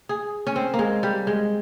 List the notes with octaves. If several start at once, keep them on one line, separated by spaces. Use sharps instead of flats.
G#4
C#4
C4
A#3
G#3
G3
G#3